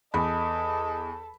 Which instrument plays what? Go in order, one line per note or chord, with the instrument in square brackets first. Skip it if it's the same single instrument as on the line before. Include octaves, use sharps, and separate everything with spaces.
[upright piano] E2 [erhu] A4 [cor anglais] D#5 [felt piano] B5